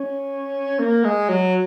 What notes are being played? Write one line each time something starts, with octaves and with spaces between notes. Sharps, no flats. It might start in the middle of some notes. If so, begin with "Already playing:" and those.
Already playing: C#4
A#3
G#3
F#3